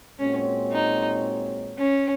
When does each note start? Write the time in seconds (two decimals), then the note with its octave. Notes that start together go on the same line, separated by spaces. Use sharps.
0.19 A#2 G#3 C4 C#4 F#4 C#5
0.73 D#4
1.78 C#4